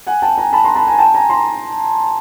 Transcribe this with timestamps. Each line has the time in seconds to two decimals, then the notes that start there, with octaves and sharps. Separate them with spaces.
0.07 F#5 G#5
0.22 G5 A5
0.38 G#5 A#5
0.53 A5 B5
0.64 A#5 C6
0.76 A5 B5
0.87 G#5 A#5
0.99 G5 A5
1.14 G#5 A#5
1.29 A#5 C6